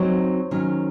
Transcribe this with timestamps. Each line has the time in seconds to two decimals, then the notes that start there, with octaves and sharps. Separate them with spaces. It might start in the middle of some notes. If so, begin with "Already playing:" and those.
Already playing: F#3 C4 D#4 C5 C#5
0.51 D#3 F#3 C#4